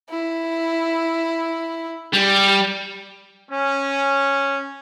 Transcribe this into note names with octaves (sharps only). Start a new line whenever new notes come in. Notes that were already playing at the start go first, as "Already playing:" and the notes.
E4
G3
C#4